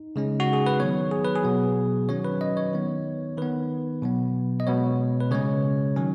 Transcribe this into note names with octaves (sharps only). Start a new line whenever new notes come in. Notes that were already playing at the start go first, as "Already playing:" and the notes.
Already playing: D#4
C#3 G#3 C#4
F#4
G#4
B4
D#3 F#3 B3 C#5
G#4
B4
G#4
B2 F#3 B3
D#3 F#3 C#4 C#5
B4
D#5
C#5
D#3 B3
D#3 B3 B4
B2 F#3 B3
D#5
B2 G#3 B3 C#5
B4
C#3 G#3 C#4 C#5
D#3 F#3 C#4